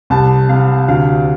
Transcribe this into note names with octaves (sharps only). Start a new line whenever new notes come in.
C2 A5
C3 F5
D2 F5